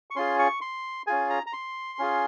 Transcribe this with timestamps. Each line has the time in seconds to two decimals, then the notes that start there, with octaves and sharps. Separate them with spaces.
0.11 C#6
0.16 C#4 F4 G#4 C6
0.39 C#6
0.61 C6
1.07 C#4 F4 G#4 G#5
1.30 A#5
1.46 A#5
1.53 C6
1.99 C#4 F4 G#4